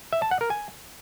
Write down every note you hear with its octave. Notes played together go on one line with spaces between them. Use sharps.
E5
A5
F#5
A#4
G#5